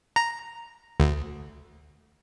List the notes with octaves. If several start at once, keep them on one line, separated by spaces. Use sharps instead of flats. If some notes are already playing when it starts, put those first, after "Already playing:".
A#5
D2